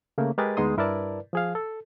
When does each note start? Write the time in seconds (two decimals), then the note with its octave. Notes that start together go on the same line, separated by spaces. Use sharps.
0.18 C#3 A3 A#3
0.38 G#3 G4 G#4 A#4 B4 A6
0.57 D2 G#3 B3 D#4 C6 D#6
0.77 G2 E4 A#4 B4 D5 A5
1.33 F3 G#4 F5
1.55 A4